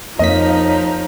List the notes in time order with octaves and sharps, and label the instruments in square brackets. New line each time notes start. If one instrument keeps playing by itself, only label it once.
[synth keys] F2 A#3 B6 [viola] F3 D#4 [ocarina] C#5 [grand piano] D#5